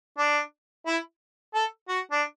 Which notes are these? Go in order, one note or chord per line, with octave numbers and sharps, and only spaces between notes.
D4
E4
A4
F#4
D4